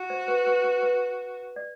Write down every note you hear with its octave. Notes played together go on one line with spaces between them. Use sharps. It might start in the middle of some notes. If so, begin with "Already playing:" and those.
Already playing: F#4
C5
B4
B4
B4
B4
D5